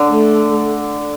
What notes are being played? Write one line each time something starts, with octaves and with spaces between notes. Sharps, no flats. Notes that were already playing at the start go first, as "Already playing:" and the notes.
Already playing: D3
A3